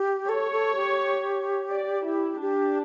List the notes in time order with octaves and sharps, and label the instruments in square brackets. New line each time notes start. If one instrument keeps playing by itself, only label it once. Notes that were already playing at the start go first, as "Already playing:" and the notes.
Already playing: [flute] G4
[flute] A4 [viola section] C#5
[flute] A4
G4
[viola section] D5
E4
[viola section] D4 [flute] G4